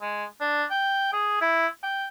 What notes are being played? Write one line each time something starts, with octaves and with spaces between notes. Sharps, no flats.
G#3
D4
G5
G#4
E4
G5